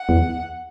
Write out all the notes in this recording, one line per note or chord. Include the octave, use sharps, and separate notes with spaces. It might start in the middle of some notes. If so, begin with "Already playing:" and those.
Already playing: F#5
E2